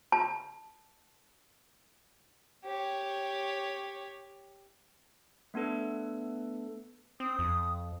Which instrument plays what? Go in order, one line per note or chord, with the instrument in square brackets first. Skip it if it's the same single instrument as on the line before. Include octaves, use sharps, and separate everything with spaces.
[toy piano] A5
[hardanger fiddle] G4 C#5
[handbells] A3 B3 D4 A4 B4
[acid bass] C4 [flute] D#6
[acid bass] F2